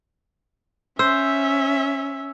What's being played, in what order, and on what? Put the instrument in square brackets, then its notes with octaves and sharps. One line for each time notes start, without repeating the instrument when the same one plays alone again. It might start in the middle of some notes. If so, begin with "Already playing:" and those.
[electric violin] C#4 [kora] C5 [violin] E5 [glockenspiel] E6